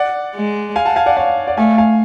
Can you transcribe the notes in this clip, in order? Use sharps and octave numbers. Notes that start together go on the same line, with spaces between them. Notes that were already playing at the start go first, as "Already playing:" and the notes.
Already playing: D5 F#5
G#3
F5 G#5
F#5 A5
F5 G#5
D5 F#5
C#5 F5
D5 F#5
A3 F5 G#5
F5 G#5